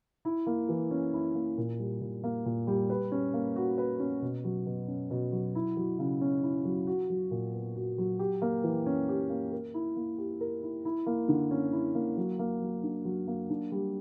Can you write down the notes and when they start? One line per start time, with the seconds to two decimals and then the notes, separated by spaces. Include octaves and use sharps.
0.25 E4
0.47 A#3
0.69 E3
0.91 C#4
1.14 E4
1.35 A#3
1.58 A#2
1.79 G3
2.01 A#2
2.24 A#3
2.46 A#2
2.67 G3
2.90 B4
3.12 C#4
3.34 A#3
3.56 F#4
3.78 B4
4.00 C#4
4.22 B2
4.44 F#3
4.66 B2
4.88 C#4
5.11 B2
5.32 F#3
5.55 E4
5.77 F#3
5.99 C#3
6.21 C#4
6.43 E4
6.65 F#3
6.87 F#4
7.10 F#3
7.31 A#2
7.53 B3
7.76 F#4
7.98 F#3
8.19 G4
8.42 A#3
8.64 E3
8.86 C#4
9.09 G4
9.30 A#3
9.52 A#4
9.74 E4
9.96 A#3
10.18 G4
10.41 A#4
10.63 E4
10.85 E4
11.06 A#3
11.28 D3
11.51 C#4
11.73 E4
11.95 A#3
12.17 F#3
12.39 A#3
12.61 F#3
12.83 D4
13.05 F#3
13.28 A#3
13.50 D4
13.72 G3